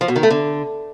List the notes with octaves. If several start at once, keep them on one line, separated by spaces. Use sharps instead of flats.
F3
B2
D#3
A3
D3